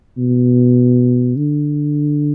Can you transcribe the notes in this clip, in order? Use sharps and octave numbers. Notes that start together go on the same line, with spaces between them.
B2
D3